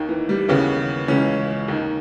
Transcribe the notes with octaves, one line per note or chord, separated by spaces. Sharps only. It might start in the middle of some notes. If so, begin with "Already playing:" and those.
Already playing: D#2 D#3
E3
G3
D#2 C#3 E3 B3
C#2 C#3 E3 C#4
D#2 D#3